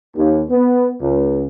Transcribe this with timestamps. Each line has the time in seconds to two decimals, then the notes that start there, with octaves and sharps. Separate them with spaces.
0.15 D#2
0.50 B3
0.99 C#2